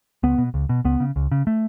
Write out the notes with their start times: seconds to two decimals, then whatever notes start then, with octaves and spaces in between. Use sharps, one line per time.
0.23 C#2 B3
0.38 B2
0.54 C#2
0.69 B2
0.85 C#2 B3
1.00 C#3
1.16 C#2
1.32 C#3
1.47 A3